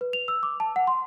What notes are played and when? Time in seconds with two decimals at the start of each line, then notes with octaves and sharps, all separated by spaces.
0.01 B4
0.13 F7
0.28 E6
0.43 D6
0.60 A5
0.76 F#5
0.87 C6